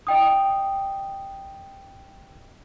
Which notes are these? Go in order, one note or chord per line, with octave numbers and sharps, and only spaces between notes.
D#5 G5 D#6